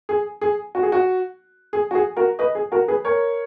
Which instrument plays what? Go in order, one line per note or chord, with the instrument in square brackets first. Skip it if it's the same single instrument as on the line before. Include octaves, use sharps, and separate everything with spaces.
[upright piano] G#4
G#4
F#4
G#4
F#4
G#4
F#4
G#4
F#4 A#4
B4 D#5
G#4
F#4 A#4
G#4 B4
A#4 C#5